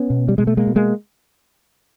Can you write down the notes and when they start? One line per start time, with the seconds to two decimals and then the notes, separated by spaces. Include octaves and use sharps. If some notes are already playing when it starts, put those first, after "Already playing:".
Already playing: B3 C#4
0.10 B2
0.28 G3
0.38 B2 G#3
0.47 A3
0.57 G#3 A#3
0.67 B2
0.76 G#3 A#3